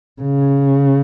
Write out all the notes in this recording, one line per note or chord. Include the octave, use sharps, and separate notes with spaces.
C#3